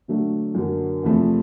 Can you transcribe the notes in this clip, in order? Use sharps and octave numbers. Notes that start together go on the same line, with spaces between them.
D3 F#3 A3 D4
F#2 D3 F#3 A#3
E2 C3 F3 A3 C4